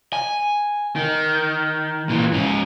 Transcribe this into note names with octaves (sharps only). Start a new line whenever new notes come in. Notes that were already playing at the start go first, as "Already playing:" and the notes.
G#5
D#3
A#2 E3
G#2 C#4